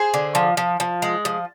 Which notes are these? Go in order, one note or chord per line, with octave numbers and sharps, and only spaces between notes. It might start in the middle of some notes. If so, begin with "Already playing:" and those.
Already playing: G#4 C5
D3
F3
F3
F3
G#3
F3